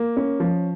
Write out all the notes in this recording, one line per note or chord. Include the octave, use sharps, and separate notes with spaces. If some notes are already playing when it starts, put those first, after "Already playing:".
Already playing: A#3
C#4
F3